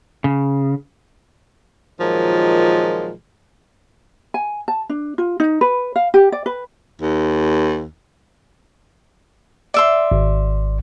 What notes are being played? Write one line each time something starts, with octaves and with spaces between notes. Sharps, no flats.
C#3
A#2 D#3 F3 F#3 G#3
G#5
A5
D4
F4
D#4
B4
F5
G4
D5
B4
D#2
D5 E5 C6
G#1